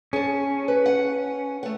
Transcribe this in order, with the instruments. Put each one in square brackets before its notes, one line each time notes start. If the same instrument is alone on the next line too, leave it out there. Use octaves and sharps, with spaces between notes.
[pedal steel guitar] C#4 [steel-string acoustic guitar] G#4 A5
[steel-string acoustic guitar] B4
F#5
A3 F#5